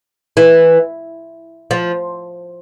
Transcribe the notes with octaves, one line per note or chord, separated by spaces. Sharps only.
E3
F3